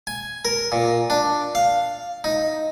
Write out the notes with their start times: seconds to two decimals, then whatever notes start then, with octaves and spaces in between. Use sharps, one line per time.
0.07 G#5
0.45 A#4
0.72 A#2
1.10 D4
1.55 F5
2.24 D#4